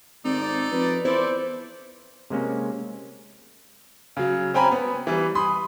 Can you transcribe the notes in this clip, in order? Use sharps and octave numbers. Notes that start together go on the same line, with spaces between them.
G#1 C4 D#4 A4 D5
F2 B4
E2 E4 A4 C5 D5
C3 G#3 A#3 C#4
C#3 F#3
C4 C#4 G5 G#5 A#5 B5
B3
E3 G3
B5 C6 D#6